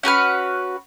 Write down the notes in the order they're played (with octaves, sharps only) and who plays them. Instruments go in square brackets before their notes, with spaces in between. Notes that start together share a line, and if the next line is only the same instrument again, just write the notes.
[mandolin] C#4 F#4 B4 F6